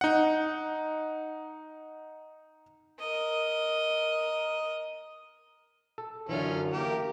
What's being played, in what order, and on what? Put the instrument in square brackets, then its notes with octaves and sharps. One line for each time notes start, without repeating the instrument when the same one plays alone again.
[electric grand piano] D#4 F#5
[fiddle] A#4 D#5
[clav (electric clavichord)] A4
[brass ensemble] F#2 [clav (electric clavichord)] D3 E3 [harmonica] C#4 F4
[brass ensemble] A3 A#3 [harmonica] G4 A#4